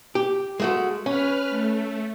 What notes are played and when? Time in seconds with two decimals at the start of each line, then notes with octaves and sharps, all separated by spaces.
0.15 G4
0.60 G#3 A3 F#4
1.06 C#4 B4 F6
1.50 A3